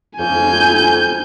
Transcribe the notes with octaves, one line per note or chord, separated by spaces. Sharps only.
F2 G#5 G6